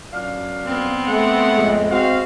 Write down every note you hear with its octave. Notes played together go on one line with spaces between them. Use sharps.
F#2 D4 F5
B3 C4
A3 F#5
F2 A2 G#3
G#3 C4 F#4 F5